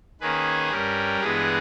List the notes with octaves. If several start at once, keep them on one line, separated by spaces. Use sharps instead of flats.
D#3 A#3 C#4 G#4 B4
G2 G3 C#4 G4 A#4
G2 E3 G#3 B3 G#4 B4